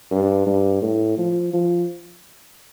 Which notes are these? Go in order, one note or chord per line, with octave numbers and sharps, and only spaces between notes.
G2
G2
A2
F3
F3